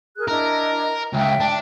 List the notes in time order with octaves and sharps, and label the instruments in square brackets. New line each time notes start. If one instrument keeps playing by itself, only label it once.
[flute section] G#4 A#4 F#6
[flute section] D4 E4 D#5 [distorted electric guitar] A#4
[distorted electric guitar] C#2 [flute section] E5 G5
[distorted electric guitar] D4